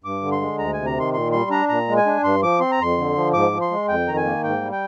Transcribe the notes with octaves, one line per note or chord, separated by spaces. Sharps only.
G2 D6
D3
C6
G#3
D2 A#5
C3 G#5
A#5
D#3 C6
A#2 C6
G3 C6
D4 A#5
A#2 A#5
G#3
G#5
D4
G2 C6
F3 D6
C4 C6
A#5
F2 C6
D3
F3
G#2 D6
F3
C6
G#3
F2 G5
D#3 A#5
G#5
A#3
G#2 G5
G3
G5